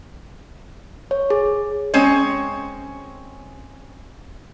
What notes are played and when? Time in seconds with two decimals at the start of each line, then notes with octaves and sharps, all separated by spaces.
1.11 C#5
1.30 G#4
1.94 G#3 C4 C#4 C#5